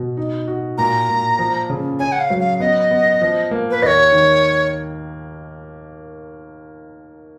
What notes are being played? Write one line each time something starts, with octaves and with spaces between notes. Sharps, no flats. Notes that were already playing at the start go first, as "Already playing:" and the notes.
Already playing: B2
D#4
F#4
A#2 A#5
A#2
F3
C#3
C#4 G#5
F#5
F5
F#3
F5
B3 D#5
B3
F3
A#3
B4
D#2 C#5 D#5
D#3